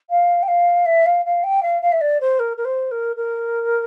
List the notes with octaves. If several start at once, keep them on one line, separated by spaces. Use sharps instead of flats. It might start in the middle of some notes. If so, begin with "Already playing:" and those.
F5
G5
F5
E5
F5
F5
G5
F5
F5
E5
D5
C5
A#4
A#4
C5
A#4
A#4